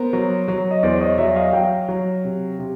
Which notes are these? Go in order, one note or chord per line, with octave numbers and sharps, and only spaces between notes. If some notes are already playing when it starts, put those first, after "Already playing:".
Already playing: B3 A#4 C5
F#3
F#3
D#5
E2 C5 D5
C#5 D#5
F#3 D5 E5
D#5 F5
F#3 F5 G5
F#3
C3
C3